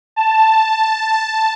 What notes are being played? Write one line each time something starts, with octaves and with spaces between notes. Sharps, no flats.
A5